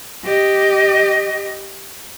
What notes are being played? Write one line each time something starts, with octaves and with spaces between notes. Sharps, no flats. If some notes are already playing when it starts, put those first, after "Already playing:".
G4 D#5